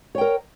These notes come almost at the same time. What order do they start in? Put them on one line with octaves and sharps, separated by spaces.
C#5 G5 A#4